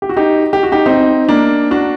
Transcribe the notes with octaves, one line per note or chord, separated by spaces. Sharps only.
G4
F#4
D#4 G4
G4
F#4
D#4 G4
C4 D#4
A#3 D4
D4 F#4